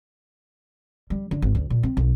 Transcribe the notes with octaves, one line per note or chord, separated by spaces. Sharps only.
G3
D3
G#1
D2
A#2
C4
B1